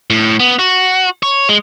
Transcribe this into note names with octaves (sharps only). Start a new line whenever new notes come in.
A2
B3
F#4
C#5
G#3